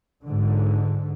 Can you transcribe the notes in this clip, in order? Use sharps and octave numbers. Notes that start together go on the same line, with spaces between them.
G#2 D3